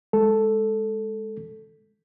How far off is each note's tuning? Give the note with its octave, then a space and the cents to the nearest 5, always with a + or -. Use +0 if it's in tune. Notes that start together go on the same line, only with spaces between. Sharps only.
G#3 +0 A4 +0